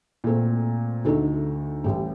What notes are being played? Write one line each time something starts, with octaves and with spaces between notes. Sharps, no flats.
A#2 A3 C4
D2 D3 A3 D#4
A1 A2 G3